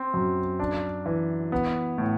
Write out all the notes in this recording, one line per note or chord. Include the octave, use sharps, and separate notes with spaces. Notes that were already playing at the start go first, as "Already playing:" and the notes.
Already playing: C4
F#2
D4
E3
B3
A2